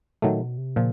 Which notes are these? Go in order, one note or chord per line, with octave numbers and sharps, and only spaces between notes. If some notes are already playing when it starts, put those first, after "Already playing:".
A#2 D#3 F#3 A3
B2
C3
A#2 C#3 F3